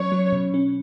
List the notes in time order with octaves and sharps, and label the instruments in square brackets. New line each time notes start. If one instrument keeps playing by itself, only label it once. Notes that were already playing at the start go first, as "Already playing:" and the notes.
Already playing: [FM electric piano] F#3 C#4 [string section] C#5
[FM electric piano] F#3
B2
C#4